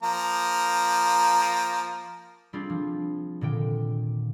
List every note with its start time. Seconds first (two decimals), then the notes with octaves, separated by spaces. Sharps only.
0.03 F3 A#3 A#5
2.53 G3 C4 D4 F4 G#4
2.70 F3
3.41 A#2 D3 D#3 G5